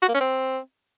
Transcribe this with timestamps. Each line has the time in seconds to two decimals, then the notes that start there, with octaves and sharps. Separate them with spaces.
0.02 F#4
0.08 A#3
0.15 C#4
0.21 C4